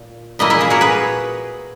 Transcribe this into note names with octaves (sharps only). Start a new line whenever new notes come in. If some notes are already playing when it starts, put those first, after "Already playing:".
Already playing: A#2
A#2 A#3 E4 B4 D#5
E4 G#4
E4 G#4
F#4 A#4
G#4 B4